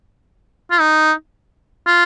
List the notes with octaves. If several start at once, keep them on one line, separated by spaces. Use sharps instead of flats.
F4
D#4
F4